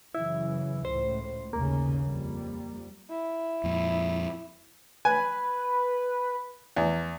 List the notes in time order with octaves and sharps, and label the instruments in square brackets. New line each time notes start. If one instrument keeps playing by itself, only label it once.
[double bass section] F#2 C#3 E3 [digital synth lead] E4
[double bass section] C#2 A2 [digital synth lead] C5
[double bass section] A1 D#2 C#3 [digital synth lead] A#3
[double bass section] F2 G3
[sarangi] E4
[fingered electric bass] F2 A#2
[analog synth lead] B4 [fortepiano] G#5
[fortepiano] E2